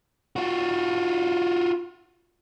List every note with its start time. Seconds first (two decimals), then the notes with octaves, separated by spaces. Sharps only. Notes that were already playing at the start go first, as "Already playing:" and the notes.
0.36 F4 F#4